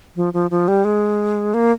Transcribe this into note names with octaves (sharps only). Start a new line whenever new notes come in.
F3
F3
F3
G3
G#3
A#3